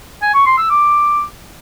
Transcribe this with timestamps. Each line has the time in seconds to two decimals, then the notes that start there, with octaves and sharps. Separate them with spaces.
0.22 G#5
0.34 C#6
0.46 C6
0.58 E6
0.70 D6